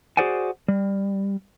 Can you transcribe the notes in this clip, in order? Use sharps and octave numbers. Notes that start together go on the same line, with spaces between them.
F#4 G#4 C5 D5 F#5 G#5
G3